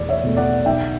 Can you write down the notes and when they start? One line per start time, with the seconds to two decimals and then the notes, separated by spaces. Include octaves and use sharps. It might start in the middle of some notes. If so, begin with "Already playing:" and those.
Already playing: E2 B2 A3 D5
0.09 C#5 E5
0.24 B2 A3
0.37 D5 F#5
0.65 B1 E5 G5